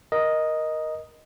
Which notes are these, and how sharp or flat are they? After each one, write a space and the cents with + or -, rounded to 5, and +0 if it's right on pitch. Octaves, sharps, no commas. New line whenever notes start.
A#4 +15 D#5 +0